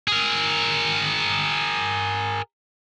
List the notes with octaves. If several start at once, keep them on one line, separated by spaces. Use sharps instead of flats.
G#4 A#4